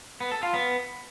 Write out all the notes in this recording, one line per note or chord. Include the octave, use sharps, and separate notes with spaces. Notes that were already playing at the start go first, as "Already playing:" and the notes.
B3
A4
F4
B3